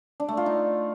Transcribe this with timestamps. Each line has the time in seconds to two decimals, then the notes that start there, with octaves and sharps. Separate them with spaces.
0.20 D4
0.28 A3
0.37 F4
0.46 D#4